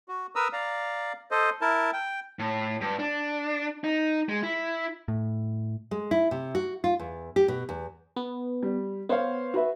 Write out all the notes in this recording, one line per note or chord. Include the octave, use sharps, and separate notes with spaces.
F#4
A#4 B4 A#5 D#6 E6
D5 F5 A#5
A4 C5 D#5
E4 A#4 A5
G5
A2
G2
D4
D#4
G#3
E4
A2
G#3
E4
C3
F#4
F4
E2
G4
B2
E2
B3
G3
B3 C5 C#5 F5
F#4 B4 E5